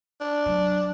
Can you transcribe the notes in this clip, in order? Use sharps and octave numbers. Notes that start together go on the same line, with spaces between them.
D4
F#3